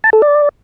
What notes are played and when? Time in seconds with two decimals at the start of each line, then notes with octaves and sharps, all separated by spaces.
0.04 A5
0.13 A4
0.22 D5